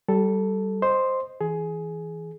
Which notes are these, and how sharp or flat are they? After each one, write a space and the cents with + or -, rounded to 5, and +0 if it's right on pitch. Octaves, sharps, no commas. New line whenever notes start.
G3 -25 A4 +0
C5 +0 D#5 -10 C6 +0
E3 -15 G#4 +15